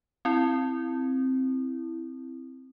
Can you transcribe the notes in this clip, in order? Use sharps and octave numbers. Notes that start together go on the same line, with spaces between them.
C4 E4